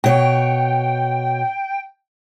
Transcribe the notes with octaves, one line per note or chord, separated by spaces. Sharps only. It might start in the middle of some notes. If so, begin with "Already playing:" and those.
B2 C#5 G5